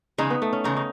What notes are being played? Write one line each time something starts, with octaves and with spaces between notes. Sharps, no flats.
E2 C#3 G#3 D#4
B3
A3
C#4
E2 C#3 G#3 D#4
D#4